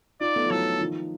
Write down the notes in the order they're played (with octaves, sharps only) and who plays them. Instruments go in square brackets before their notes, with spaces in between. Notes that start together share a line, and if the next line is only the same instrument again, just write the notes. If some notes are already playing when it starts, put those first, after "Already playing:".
[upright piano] D#4 F4 [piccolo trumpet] D5
[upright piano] A3 B3
F3
[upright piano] E3 F#3 [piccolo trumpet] A4
[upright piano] D#3 F3